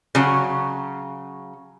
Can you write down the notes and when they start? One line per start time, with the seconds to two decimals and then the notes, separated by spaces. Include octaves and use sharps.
0.15 C#3 F#3